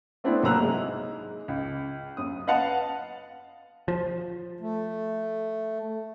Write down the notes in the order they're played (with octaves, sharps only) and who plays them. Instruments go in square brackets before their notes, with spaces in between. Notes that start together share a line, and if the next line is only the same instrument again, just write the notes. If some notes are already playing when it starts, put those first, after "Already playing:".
[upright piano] A3 B3 C4 D4 E4
C2 F#3 A#3 A#5 E6 F#6
G#2 G#3
C#2
F#2 D#6
B4 D#5 F5 F#5 A5
[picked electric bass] F3
[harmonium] A3